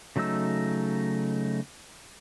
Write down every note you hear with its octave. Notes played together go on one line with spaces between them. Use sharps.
C#3 F#3 A3 D#4 E6